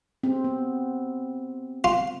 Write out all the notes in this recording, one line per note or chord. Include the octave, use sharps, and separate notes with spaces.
C4
B3
F4